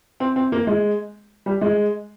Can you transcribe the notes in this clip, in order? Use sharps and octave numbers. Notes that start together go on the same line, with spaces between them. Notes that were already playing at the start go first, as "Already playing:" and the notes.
C4
C4
A#3
G#3
G3
G#3